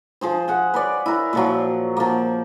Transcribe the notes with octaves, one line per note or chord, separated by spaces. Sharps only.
F3 G#4 C5
G#4 F#5
B4 C#5 D5
E4 A#4
A#2 F3 F#3
F3 A#3